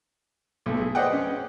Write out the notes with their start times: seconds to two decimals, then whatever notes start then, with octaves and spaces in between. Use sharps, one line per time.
0.66 B1 A3
0.81 G#4
0.95 B4 C5 D5 D#5 F#5 G5
1.13 C#4